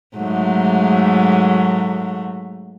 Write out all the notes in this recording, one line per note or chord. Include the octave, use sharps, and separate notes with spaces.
G#2 F#3 A3